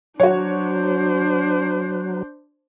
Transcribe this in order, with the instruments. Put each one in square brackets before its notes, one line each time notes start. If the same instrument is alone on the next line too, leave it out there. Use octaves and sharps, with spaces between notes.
[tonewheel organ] F#3 [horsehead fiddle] D4 C5 [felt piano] F#4 C#5